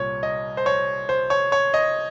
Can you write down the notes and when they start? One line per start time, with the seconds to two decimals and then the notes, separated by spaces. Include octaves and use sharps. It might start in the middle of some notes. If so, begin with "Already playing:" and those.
Already playing: C2 A#2 C#5
0.23 D#5
0.57 C5
0.66 C#5
1.09 C5
1.30 C#5
1.52 C#5
1.74 D#5